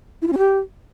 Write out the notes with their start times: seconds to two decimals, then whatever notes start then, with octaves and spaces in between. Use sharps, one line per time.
0.22 E4
0.27 F4
0.33 C#4
0.38 G4